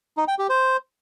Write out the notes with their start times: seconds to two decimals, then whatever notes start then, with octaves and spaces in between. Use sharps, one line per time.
0.17 D#4
0.28 G5
0.39 G4
0.49 C5